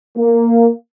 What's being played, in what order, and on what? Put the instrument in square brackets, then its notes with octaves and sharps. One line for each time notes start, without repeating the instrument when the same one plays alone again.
[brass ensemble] A#3